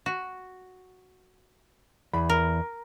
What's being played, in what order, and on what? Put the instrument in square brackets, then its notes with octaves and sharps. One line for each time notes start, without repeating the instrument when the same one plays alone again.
[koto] F#4
[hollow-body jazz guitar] E2 B5
[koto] A#4